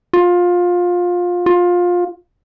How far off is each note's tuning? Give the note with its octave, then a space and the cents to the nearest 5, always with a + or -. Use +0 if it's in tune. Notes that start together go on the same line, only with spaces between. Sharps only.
F4 +20
F4 +20